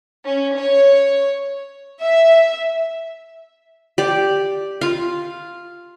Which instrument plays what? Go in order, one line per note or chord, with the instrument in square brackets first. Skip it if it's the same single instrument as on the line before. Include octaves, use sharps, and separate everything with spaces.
[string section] C#4
C#5
[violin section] E5
[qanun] G4 D5
F4 F5